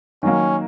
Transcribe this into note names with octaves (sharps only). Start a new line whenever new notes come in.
D#3 F#3 A#3 C#4